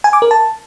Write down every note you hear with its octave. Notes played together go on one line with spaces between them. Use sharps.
G#5
D6
A#4
A5